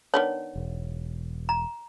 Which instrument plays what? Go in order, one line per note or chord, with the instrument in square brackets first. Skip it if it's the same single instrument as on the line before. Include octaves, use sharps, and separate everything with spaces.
[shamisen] D#3 B3 D4 [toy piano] C#5
[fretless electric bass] E1
[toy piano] A#5